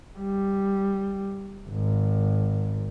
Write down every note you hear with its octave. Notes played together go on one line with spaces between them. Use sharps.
G3
G#1